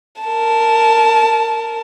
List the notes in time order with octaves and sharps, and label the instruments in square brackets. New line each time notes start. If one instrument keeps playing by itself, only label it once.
[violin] A#4 A5